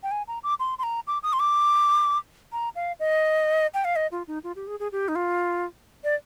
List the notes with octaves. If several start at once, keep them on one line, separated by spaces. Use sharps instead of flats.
G5
G#5
A#5
D6
C6
C6
A#5
D6
D#6
C6
D6
A#5
F5
D#5
G5
F5
D#5
F4
D#4
F4
G4
G#4
G#4
G4
D#4
F4
D5